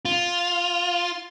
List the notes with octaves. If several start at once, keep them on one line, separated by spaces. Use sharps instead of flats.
F4